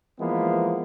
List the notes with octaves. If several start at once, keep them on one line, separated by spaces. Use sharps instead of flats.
E3 F3 G#3 A#3 B3